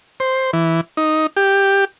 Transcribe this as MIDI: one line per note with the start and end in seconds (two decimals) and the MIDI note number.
0.20 0.51 72
0.53 0.81 52
0.97 1.27 63
1.37 1.85 67